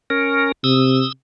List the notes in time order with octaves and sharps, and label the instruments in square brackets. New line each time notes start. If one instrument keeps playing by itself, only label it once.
[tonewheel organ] C#4 A#4
[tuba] C3 [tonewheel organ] D#6 E6